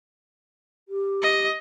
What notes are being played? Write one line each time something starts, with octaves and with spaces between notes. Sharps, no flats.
G4
D#5